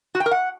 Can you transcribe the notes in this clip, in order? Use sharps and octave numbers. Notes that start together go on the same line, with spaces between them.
F#4
G5
A#4
F#5